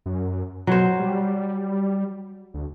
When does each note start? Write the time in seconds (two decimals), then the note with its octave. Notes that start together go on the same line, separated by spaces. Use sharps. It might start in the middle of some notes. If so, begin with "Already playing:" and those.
0.06 F#2
0.67 B2 F#3 C5
1.00 G3
2.54 D2